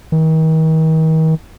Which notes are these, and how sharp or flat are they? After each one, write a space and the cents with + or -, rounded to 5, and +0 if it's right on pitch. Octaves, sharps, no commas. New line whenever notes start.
D#3 +40